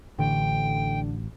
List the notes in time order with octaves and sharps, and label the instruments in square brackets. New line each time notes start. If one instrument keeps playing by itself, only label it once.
[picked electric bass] A1 [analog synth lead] D3 [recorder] G5